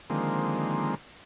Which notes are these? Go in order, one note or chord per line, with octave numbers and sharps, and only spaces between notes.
D3 D#3 F3 G#3 A#3 C4